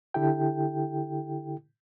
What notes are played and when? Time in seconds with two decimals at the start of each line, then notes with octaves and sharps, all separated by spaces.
0.14 D3 E4 G4 A4 G5